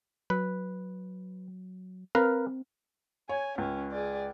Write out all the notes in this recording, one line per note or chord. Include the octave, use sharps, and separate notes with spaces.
F#3 B4
C4 A#4 B4 F5
C#5 G#5
C#2 C#4
G#4 D5